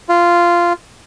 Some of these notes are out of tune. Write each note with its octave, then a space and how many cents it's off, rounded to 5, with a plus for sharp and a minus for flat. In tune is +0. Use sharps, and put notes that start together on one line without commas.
F4 -10